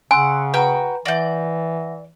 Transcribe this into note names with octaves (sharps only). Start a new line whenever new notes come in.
C#3 F#5 G#5 C6 E6
F#4 B4 G5 A#5 B5
E3 D5 E5 F#5 G6 A#6